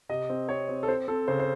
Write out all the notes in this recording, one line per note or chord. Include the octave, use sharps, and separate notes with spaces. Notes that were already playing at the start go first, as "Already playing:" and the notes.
C3 D#5
C4
C4 C#5
C4
A4
C4 C5
C4 A4
C#3 C5
C5